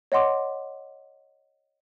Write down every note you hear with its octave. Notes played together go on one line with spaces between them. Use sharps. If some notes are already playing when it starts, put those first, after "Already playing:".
C#5 D#5 F#5 C6 D6